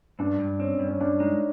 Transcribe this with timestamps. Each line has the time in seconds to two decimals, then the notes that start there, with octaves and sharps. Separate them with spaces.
0.19 G2 D4
0.40 G2
0.59 C4 C#4
0.79 G2
0.88 C#4
1.01 G2 D4
1.20 G#3 D#4